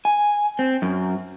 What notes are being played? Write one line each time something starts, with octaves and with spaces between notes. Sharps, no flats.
G#5
C4
F#2